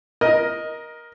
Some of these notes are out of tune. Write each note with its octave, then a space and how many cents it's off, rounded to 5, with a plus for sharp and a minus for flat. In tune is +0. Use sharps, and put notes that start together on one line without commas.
A#4 +15 D#5 +0